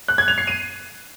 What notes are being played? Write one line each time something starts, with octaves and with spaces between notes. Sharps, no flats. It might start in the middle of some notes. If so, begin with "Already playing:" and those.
F#6
G#6
F7
C7
D#7